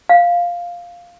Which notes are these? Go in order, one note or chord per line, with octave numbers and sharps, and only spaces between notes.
F5